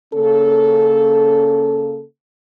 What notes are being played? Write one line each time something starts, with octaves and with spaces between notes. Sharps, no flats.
C#3 A#3 C#4 A4